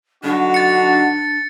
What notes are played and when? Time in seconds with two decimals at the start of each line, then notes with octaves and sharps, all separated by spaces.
0.24 D3 F#3 D4 D#4 F#4
0.54 A6 C#7